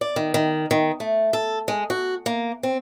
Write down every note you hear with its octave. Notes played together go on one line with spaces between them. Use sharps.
D5
D#3
D#3
D#3
A3
A4
G#3
F#4
A#3
C4